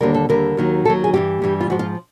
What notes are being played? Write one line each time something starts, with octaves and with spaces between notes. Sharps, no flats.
D#2 D3 G3 A#4
A4
D#2 D3 G3 A#4
D#2 D#3 F#3
D#2 D#3 F#3 A4
G#4
G2 E3 G3 G4
G2 E3 G3
F4
G#2 F3 F#4
F4